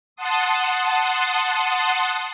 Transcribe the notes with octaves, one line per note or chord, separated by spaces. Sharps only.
F#5 A5 C6 D#6